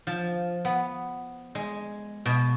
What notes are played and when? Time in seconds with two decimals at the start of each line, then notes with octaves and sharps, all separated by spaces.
0.07 F3
0.65 B3
1.55 G#3
2.26 B2